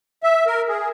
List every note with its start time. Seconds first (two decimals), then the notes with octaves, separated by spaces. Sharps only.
0.23 E5
0.47 A#4
0.68 G#4